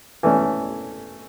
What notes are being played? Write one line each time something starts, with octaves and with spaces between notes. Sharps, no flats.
E3 A3 C#4